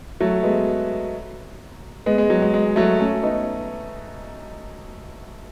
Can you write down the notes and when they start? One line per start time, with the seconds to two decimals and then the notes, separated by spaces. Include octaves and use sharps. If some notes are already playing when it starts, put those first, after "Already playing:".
0.21 F#3 A3
0.43 G#3 B3
2.06 G#3 B3
2.18 G#3
2.30 F#3
2.42 G#3
2.54 G#3
2.76 F#3 A3
3.00 A3 C#4
3.23 B3 D#4